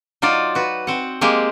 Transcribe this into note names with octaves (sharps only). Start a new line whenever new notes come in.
F#3 D#4 F4 D5
F#4 B4
C4 F#5
G#3 A#3 C4 G4